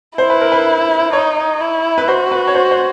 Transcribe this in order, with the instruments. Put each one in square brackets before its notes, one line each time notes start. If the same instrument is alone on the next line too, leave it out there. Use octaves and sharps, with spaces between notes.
[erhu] E4 [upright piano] C5
[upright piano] B4
A#4
B4
[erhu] D#4 [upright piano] C#5
[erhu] E4
[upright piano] B4
[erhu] F#4 [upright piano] C5
[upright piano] B4
C#5
C5
C5